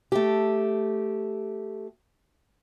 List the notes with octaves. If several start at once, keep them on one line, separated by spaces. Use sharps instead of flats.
A3 G4